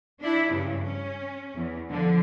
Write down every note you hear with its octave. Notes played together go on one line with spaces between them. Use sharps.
D4 E4
G2 C#3
C#4
E2
D3 F3